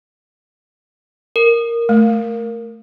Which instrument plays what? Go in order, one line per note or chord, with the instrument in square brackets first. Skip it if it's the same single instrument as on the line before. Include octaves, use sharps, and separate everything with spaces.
[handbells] A#4
[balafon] A3